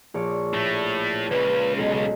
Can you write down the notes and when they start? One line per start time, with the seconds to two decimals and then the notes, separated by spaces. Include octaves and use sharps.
0.14 A#1 C#5 D5
0.54 A2 A3
1.31 C#2 C#3 B4
1.76 B1 G#3 C7 C#7